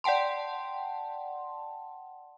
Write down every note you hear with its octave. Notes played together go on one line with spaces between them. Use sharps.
D5 F#5 G5 A5 C6